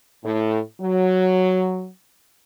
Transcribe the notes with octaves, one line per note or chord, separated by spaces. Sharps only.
A2
F#3